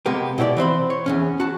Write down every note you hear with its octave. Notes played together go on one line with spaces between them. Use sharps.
C3 G#3 A#3 B3 G4
B2 E4 G4 C5 D5
E3 C4 C5 B5
C#5
E2 G#2 C#4
F#4 A5